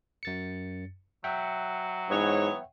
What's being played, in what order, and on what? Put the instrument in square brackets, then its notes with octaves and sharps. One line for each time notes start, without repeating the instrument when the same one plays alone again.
[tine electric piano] F#2 A6 C#7
[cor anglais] F#3 [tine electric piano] E5 F#5 G5
[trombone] G#2 [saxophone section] E3 B3 C#5